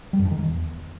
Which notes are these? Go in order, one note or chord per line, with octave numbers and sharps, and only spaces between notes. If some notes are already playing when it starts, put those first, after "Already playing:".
G3
F#2
G2
D#3
E2